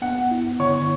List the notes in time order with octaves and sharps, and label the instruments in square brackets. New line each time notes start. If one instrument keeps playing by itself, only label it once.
[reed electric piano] B3 [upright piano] F#5
[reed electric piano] E4
[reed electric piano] D3 [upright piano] C#5 C#6